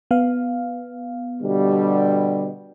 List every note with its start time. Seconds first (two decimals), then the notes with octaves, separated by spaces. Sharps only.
0.11 B3 F5
1.41 B2 D3 G3